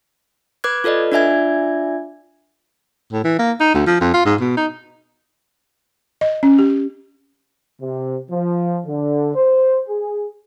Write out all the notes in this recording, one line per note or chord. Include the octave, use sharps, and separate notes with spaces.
B4 D6 F#6 G#6
F4 A4 B4 D5 D#5
D4 F4 D5 E5 G#5 G#6
A2
E3
A#3
D#4
D2
F3
F2
F4
G#2
B2
D#4
D#5
C#4
G4
C3
F3
D3
C5
G#4